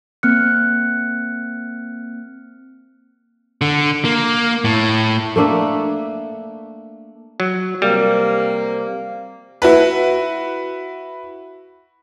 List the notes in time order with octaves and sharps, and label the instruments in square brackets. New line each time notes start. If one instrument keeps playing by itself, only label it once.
[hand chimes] A#3 C4 F6 F#6 C#7
[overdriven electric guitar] D3
A#3
A2
[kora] A3 A#3 D4 E5
[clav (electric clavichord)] F#3
[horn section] C3 A#3 [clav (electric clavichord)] G3
[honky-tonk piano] E4 F#4 B4